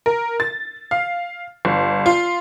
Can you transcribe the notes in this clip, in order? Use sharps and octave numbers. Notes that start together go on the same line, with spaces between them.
A#4
A6
F5
G1
F4